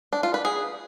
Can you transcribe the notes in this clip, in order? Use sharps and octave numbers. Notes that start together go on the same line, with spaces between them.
D4
F4
B4
G#4